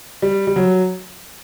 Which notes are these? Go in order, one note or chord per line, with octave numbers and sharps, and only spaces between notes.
G3
G3
F#3